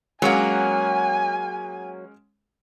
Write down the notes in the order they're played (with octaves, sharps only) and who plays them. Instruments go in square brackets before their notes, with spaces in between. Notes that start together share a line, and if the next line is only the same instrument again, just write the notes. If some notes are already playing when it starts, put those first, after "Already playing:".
[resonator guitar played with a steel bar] F#3 A#3 [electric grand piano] G#3 C#4 F#5 [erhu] G#5